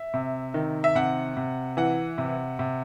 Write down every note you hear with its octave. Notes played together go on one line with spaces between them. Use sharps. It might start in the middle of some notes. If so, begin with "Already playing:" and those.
Already playing: E5
C3
D#3
E5
C3 F#5
C3
E3 F#5
C3
C3